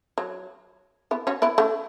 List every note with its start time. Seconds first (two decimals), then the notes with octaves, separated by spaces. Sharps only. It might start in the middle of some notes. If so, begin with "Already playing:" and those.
0.18 F#3
1.11 B3 E4
1.27 C#4 F#4
1.42 B3 E4
1.58 A3 C#4